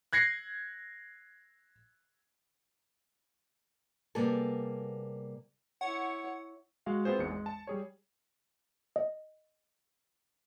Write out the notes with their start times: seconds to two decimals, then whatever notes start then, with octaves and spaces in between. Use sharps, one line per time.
0.13 F#6 G#6 A#6 C7 C#7
4.15 C3 G3 A#3 B3 G#4 A4
5.81 E4 C#5 F#5
6.86 G#3 F#4 F5
7.05 B3 C4 F4 G#4 C5
7.19 G#1 E2 G#2 G#3 C#7
7.31 G#3
7.46 A5
7.67 G3 G#4 C#5
8.96 D#5